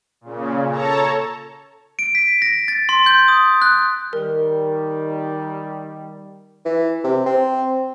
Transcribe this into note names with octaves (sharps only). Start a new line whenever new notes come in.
A#2 C#3
A4 C#5 A5 A#5
D7
B6
A#6
A6
C6
G6
D#6
F#6
D#3 G3 A#4
E3
C3
C4